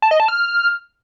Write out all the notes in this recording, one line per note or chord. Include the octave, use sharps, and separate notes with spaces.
A5
D#5
A5
F6